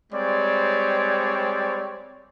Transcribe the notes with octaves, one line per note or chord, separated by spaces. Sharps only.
G3 G#3 C4 C#5 D5